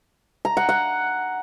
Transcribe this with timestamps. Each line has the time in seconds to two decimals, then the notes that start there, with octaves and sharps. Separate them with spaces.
0.45 A#5
0.57 F#5
0.69 F#5